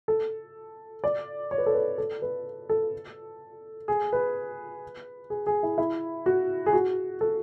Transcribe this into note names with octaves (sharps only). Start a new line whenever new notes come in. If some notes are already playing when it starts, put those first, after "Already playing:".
A4
D5
C#5
B4
A4
B4
A4
B4
A4
G#4
B4
G#4
G#4
E4
E4
F#4
G#4
F#4
A4